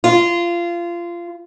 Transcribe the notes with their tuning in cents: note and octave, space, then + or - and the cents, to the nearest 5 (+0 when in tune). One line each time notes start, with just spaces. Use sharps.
F4 -20